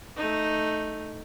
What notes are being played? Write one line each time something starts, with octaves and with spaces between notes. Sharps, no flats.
A3 D#4